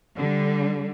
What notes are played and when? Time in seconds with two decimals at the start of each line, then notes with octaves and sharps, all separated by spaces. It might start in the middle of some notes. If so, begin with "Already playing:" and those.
0.17 D3 G3